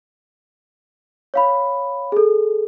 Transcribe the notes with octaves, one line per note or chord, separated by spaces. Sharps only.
C#5 F5 B5
G#4 A4